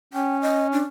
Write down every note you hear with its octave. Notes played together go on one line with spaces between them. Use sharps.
C#4 G5
D#5
D4